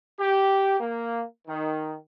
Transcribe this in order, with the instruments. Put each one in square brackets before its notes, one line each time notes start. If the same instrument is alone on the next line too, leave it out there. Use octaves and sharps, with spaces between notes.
[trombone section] G4
A#3
D#3